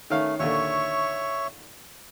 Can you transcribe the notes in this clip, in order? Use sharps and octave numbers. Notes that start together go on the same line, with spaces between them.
D#3 A3 C#4 F5
D#2 A#2 D3 C#5 E5 C#6